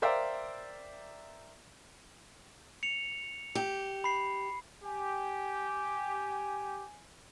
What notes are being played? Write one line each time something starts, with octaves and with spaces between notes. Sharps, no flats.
A#4 C5 D5 E5 F5 G5
C#7 F7
G4
B5 C7
G4 G#5